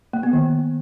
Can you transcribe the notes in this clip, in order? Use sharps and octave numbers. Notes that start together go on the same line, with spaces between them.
A#3
B3
D#3